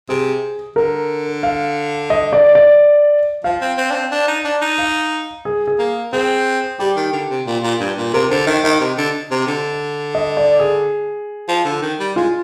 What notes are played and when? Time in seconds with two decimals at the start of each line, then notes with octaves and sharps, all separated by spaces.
0.09 C3 G#4
0.76 D3 A#4
1.43 F5
2.10 D#5
2.33 D5
2.55 D5
3.44 F3 F5
3.61 C4
3.78 C4
3.90 D4
3.94 C4
4.12 D4
4.28 D#4
4.45 D4
4.62 D#4
4.78 F5
5.45 G#4
5.67 G#4
5.79 A#3
6.13 C4 G#4
6.79 G3 G4
6.96 D#3
7.13 D3
7.30 C3
7.47 A#2
7.63 A#2
7.80 G2
7.97 A#2
8.14 C3 A#4
8.30 D3 C5
8.47 D#3 D#5
8.64 D#3 D#5
8.81 C3
8.97 D3
9.31 C3
9.47 D3
10.15 D#5
10.37 D5
10.60 G#4
11.49 F3
11.65 D3
11.82 D#3
12.00 G3
12.16 G#3 F4